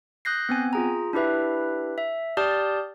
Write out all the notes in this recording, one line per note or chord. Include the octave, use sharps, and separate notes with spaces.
D#6 F#6 G6 A#6 C7
B3 C4 G#5
F4 G#4 A#5
D4 E4 G4 B4 E5
E5
G4 D5 A5 D#6 F6 G6